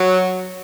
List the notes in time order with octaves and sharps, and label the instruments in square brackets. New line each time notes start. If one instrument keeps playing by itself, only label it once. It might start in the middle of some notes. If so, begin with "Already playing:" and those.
Already playing: [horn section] F#3